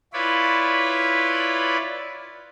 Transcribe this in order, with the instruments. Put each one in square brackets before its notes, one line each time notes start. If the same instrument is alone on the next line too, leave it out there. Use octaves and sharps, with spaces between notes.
[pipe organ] E4 F4 B4 C#5 D5 B5